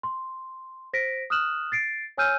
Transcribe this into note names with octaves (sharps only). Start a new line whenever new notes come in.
C6
C5 A#6 B6 D7
D#6 F6 F#6 E7 F#7
A6 C7 D7
C#5 G#5 E6 F6 G6 D#7